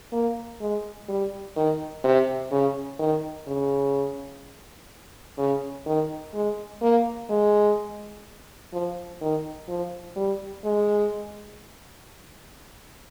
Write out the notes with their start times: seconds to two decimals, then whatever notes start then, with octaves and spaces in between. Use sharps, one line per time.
0.13 A#3
0.61 G#3
1.09 G3
1.56 D#3
2.04 C3
2.52 C#3
2.99 D#3
3.47 C#3
5.38 C#3
5.86 D#3
6.34 G#3
6.82 A#3
7.30 G#3
8.73 F3
9.21 D#3
9.68 F3
10.16 G3
10.64 G#3